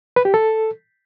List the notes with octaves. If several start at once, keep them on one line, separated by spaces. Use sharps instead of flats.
B4
G4
A4